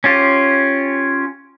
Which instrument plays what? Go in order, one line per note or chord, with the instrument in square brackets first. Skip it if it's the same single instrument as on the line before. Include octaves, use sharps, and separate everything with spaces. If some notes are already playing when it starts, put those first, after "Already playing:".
[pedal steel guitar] C#4 F4 G4